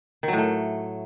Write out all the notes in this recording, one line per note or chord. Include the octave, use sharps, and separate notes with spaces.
D#3
F#3
A2
A3